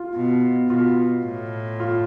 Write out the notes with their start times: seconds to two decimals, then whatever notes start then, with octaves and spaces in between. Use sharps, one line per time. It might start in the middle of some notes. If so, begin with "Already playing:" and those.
Already playing: F4
0.15 B2
0.69 B2 F4
1.24 A2
1.80 F4